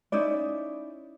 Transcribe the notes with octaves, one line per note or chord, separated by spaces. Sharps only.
C#4 D#4 E4 D5